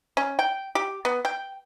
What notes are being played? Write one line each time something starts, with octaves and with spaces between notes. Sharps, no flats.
C#4
G5
G4
B3
G5